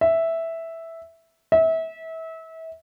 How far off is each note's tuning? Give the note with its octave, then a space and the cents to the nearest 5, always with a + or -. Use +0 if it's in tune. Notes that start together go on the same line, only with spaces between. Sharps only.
E5 -5
E5 -30